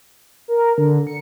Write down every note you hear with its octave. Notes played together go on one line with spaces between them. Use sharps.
A#4
D3
C#7